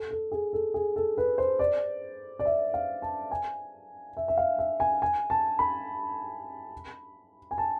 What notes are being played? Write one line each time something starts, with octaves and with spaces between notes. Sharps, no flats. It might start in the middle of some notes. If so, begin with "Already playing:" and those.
Already playing: A4
A4
G#4
A4
G#4
A4
B4
C5
D5
D5
E5
F5
A5
G#5
E5
E5
F5
E5
G#5
G#5
A5
B5
G#5
A5